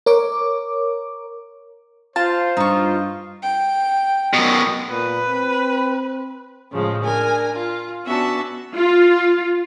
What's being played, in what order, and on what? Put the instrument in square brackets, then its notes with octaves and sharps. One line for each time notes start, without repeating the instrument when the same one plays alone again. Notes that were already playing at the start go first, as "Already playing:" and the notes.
[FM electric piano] A#4 C#5 D6
[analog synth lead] F4 [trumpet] C5 [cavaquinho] A5
[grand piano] G2 [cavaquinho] D#4 C#6
[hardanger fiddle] G5
[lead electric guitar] F#2 B2
[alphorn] A#2 [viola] B4
[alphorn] C4
[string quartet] A2 C#3 F3 G#3
D4 A#4 G#5
F4
B3 C#4 D4 F#4 E5 A5
[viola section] F4